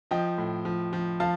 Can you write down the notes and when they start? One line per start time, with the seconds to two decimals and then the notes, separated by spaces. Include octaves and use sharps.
0.11 F3 D#5 G5
0.38 A2
0.65 F3
0.93 F3
1.20 F3 F5 A5